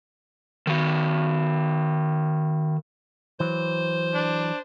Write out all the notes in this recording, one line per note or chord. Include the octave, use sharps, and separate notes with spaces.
D#3 F#4
E3 F#3 C5
D4